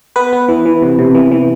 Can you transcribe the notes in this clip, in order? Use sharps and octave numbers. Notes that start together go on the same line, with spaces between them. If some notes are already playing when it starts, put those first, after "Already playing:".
B3 B4
B3
E3
E3
C3
C3
E3
E3